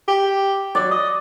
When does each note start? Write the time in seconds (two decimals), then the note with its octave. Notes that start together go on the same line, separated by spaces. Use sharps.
0.08 G4
0.75 F#3 D5
0.91 D#5